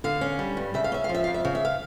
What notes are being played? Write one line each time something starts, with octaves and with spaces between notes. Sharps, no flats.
D3 F5
C#4
G3
G2
C#3 E5
F5
C#4 E5
F5
F3
E5
F2 F5
E5
C#3 F5
E5
F5